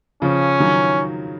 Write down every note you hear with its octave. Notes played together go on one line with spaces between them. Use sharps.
C#3 F3 C#4
D#3 F#3